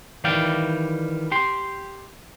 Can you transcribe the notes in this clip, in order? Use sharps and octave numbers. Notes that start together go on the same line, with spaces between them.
D#3 E3 G3 D5 F5 G5
G4 C6